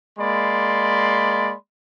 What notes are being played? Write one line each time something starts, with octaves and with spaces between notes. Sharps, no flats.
G#3 A#3 D5 B5 C6